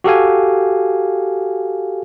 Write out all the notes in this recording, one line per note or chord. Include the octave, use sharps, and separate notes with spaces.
F#4 G4 A4 F5 G#5